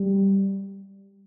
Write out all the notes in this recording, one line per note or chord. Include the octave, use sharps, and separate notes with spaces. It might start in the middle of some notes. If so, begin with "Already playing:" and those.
Already playing: G3